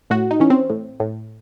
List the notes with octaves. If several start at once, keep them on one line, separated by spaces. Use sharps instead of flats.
A2 F#4
D#4
E3 C#4
C4
A2
A2